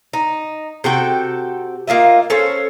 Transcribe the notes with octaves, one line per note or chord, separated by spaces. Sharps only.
D#4
C3 F#4 A4 G5
A#3 F4 D#5 E5
C#4 A4 C5 C#5